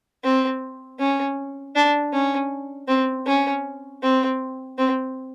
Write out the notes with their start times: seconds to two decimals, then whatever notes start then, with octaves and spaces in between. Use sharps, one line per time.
0.24 C4
0.99 C#4
1.75 D4
2.12 C#4
2.88 C4
3.26 C#4
4.02 C4
4.78 C4